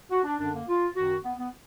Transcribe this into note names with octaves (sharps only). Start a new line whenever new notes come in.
F#4
D4
F#2 D3 D4
A#3
F4
F#2 D#3 F#4
B3
B3